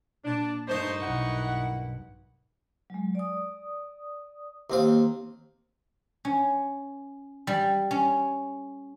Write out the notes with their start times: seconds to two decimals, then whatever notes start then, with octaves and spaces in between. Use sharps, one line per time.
0.24 A#2 D4
0.67 G2 A3 A#3 D#4 C5 C#6
1.01 B1 G2 E4 A#4 F#5
2.90 F#3 G#3
3.15 D5 D#6
4.70 D#2 A#3 C4 F5
6.25 C#4
7.47 G3
7.91 C#4